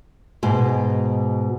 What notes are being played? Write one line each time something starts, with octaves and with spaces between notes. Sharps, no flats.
G#2 B2